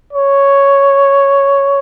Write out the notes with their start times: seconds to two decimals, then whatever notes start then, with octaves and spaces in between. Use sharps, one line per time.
0.13 C#5